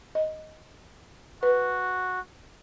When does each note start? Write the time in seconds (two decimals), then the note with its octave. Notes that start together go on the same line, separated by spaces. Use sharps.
0.15 D#5
1.43 F#4 B4